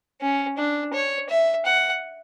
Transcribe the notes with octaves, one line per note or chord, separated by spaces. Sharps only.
C#4
D4
C#5
E5
F#5